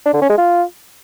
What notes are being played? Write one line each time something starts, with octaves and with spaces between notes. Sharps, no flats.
D4
D3
C#4
G#3
F4